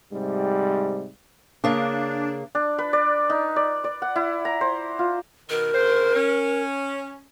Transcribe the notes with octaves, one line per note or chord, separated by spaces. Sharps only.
G#2 C3 G3
C#3 A#3 D4
D4
B4
D5
D#4
D5
D5
F#5
E4
A#5
C5
F4
B2 D#3 A#4
D2 C#3 C5
C#4